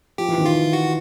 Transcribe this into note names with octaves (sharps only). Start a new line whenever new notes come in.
F3 G4
E3
D#3
E3 F4
F#4